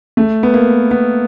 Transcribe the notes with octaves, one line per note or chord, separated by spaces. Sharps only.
A3
B3
A#3
B3